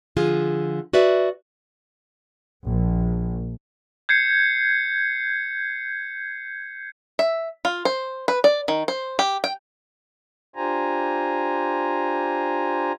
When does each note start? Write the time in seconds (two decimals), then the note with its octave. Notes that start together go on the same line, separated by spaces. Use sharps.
0.17 D3 F3 F4 G#4
0.93 F#4 B4 D5 E5
2.64 A#1
4.09 G6 G#6 C7 C#7
7.19 E5
7.65 F4
7.85 C5
8.28 B4
8.44 D5
8.68 D#3
8.88 C5
9.19 G4
9.44 G5
10.56 D4 F4 G4 C5 G#5 A#5